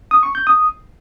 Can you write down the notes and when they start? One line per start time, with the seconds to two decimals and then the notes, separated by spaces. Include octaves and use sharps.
0.11 D#6
0.23 C#6
0.35 G6
0.47 D#6